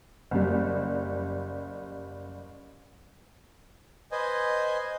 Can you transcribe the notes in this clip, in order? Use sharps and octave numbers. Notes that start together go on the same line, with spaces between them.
F#1 G3
B4 C5 D#5 G#5